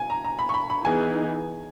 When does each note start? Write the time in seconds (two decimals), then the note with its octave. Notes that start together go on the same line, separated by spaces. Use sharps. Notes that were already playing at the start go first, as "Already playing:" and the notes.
Already playing: G#5
0.10 A#5
0.24 A#5
0.39 B5
0.49 C#6
0.54 B5
0.70 B5
0.84 E3 B3 D#4 G#4 G#5